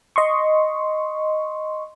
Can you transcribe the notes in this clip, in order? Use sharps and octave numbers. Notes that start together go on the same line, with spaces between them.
D#5 C6 C#6